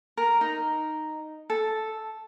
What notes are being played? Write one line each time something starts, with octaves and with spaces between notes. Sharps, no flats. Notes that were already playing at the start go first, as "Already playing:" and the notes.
A#4
D#4
A4